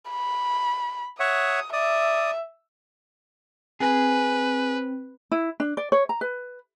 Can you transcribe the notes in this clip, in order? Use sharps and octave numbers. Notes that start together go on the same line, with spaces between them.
B5
C#5 E5 F#5 D#6
D5 E5 D#6
C4 G#4 B4
E4
D4
D5
C#5
A#5
B4